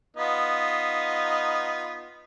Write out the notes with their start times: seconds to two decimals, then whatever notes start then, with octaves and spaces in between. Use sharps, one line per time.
0.17 B3 D#4 F4